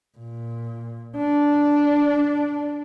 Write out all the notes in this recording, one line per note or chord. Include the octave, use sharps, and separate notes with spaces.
A#2
D4